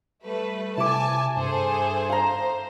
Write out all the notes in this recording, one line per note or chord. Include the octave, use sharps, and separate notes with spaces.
G3 A3 B4
C3 E4 G#5 A5 D6
G2 G#4 A4 C5
C5 F5 A#5